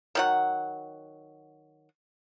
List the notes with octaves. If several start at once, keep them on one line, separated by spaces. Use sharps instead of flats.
D#3 F#3 F#5